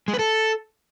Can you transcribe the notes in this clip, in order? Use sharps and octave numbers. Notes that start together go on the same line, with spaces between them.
G#3
B4
A4